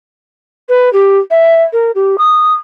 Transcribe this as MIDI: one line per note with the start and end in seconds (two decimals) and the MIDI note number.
0.69 0.91 71
0.93 1.18 67
1.30 1.62 76
1.73 1.91 70
1.95 2.16 67
2.18 2.53 87